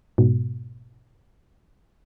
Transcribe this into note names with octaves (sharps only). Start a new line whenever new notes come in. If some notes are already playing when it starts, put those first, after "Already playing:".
G#2 B2